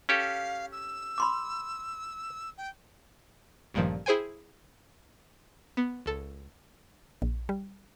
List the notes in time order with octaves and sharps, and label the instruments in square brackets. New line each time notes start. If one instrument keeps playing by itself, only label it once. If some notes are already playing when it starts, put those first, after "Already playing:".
[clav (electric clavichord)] C#4 G4 A4 [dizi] F5
[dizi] E6
[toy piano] B5 C6 D6
[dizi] G5
[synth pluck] A1 G2 A#2 D#3 F3
E4 G#4 C5 G5 G#5
B3
C#2 A4
[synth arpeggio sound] A#1
G3